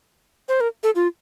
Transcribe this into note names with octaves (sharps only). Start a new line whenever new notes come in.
C5
A#4
A4
F4